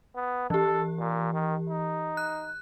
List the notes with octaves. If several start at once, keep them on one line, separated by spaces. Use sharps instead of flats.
B3
E3 G4 A4
A#2
D#3
D#4
F#6